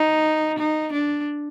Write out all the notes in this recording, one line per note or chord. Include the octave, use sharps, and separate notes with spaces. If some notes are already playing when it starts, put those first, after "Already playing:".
Already playing: D#4
D#4
D4